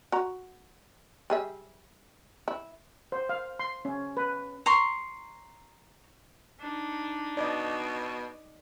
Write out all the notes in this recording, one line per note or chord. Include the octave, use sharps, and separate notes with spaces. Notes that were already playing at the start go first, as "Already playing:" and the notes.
F#4 A#5
G3 G#4 E5
E4
C5
F5
C6
C#4
B4
A#5 C6 C#6
D4 D#4
B2 D5 D#5